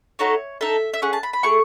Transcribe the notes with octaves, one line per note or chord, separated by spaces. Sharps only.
A3 D#4 F#4 A4 C#5
D#4 A4 E5
E5
C#4 G#4 F#5
A5
B5
B5
A3 E4 G#4 C#6